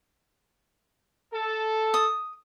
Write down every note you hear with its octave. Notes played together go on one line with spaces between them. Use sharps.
A4
D#6